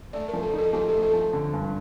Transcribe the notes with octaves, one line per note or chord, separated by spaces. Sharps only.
A3 D5
A#4
F3
A4
D#4
A4
F3 G4
A3 A4
A4
F3
D3
G2